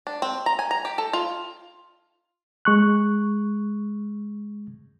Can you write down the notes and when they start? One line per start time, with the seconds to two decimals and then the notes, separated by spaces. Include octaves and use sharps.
0.07 D4
0.22 C4
0.46 A#5
0.59 G#5
0.71 A#5
0.85 G4
0.98 A4
1.13 F4
2.65 G#3 C#6 F#6